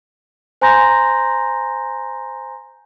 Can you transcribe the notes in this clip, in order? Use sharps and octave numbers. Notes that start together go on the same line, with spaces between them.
C5 G#5 A#5 C6 G6 A#6